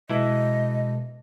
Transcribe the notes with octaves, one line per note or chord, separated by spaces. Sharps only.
B2 E3 G#3 E4 D#5 A5